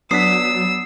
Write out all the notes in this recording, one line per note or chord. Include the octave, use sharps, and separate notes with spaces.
F#3 B3 D4 D#6 E6 B6 C7